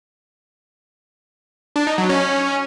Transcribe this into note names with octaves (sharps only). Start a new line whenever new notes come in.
D4
D#4
F#3
C#4